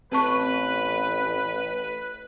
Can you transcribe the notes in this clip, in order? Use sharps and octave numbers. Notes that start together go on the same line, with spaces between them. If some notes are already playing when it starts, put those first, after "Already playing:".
A1 C4 B4 A5 C#6